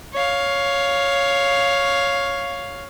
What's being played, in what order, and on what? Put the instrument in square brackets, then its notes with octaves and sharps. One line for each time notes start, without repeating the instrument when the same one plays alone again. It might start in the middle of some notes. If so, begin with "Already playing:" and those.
[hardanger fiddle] C#5 F5